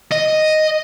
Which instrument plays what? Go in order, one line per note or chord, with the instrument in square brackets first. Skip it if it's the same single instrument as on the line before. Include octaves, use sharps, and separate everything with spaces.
[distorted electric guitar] D#5